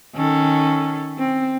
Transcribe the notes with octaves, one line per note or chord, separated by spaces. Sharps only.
D#3 C#4 A4
C4